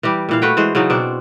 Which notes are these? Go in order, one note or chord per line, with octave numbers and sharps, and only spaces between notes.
E3 G3 G4
A#2 E3 F5
A3 F#4 B4 G5
E3 G#3 C5
C#3 E3 F#3 D#4
B2 C4 D4